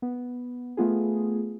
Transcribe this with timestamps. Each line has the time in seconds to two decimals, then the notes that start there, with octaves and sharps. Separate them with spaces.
0.02 B3
0.77 A3 B3 F4 G#4